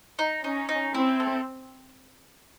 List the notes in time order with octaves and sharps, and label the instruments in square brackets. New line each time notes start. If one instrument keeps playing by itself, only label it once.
[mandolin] D#4
[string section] C#4 [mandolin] D#4
[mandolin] D#4
[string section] C4 [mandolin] E4
[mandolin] A4